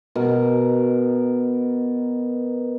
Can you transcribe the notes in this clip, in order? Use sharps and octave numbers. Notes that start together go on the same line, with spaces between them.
B2 A#4